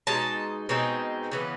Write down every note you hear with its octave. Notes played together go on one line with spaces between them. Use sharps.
B2 G#3 D#4 A5
B2 G#3 C4 D#4
C#3 E3 B3